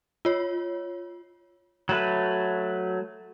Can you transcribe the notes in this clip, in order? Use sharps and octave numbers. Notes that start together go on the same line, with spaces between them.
F4 C#5
F#3 A3 B4